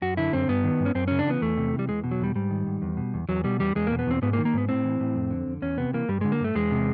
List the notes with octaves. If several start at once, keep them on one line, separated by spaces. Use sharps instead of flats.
F#2 F#4
D3 E4
F#2 C4
G2 B3
D#3
G2
C#4
F#2 C4
C#3 C#4
D4
E3 B3
E2 A3
C3
E3
G3
E2 G#3
B2
F#3
E2 G3
G#2 G3
D#3
G#2
E2
B2
E2
E2 F#3
B2 G3
E2 G3
E2 G#3
B2 A#3
B3
E2 C4
G#2 B3
A#3
D#3
A#3
G#2 B3
A2 C4
E3
A2
F2
D3
F2
E2 C#4
C3 B3
E3 A#3
G2 G3
D3 G#3
A#3
G2 A3
E2 G#3
C3